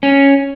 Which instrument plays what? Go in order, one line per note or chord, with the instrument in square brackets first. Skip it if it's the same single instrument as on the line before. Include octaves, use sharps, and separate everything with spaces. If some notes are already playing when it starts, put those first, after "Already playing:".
[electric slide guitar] C#4